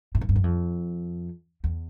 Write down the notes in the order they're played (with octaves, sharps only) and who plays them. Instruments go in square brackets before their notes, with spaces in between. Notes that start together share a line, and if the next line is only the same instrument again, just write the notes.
[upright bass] A2
G#2
G2
F#2
F2
E2